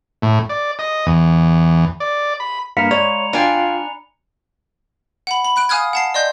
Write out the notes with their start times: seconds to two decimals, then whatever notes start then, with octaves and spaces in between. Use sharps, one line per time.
0.22 A2
0.50 D5
0.79 D#5
1.06 E2
2.00 D5
2.40 B5
2.77 G2 A#3 F5 A#5 B5 F6 C#7
2.91 G#3 C#5 D5 F7
3.33 D4 F4 F5 G5 G#5
5.27 F#5 B5
5.45 B5
5.56 B5 F#6 D7
5.69 F5 G#5 D#6 F6 F#6 G#6
5.93 F#5 A5 C7
6.14 D5 D#5 C6 G6